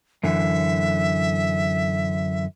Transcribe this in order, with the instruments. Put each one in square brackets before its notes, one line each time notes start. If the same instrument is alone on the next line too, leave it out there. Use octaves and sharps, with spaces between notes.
[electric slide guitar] F#2 D3 E3 [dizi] E5